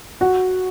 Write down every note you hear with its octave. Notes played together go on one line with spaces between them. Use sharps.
F#4